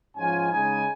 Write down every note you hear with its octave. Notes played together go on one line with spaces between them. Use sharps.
G#2 F3 C#4 F4 G#5
C#3 G#3 D#4 G#5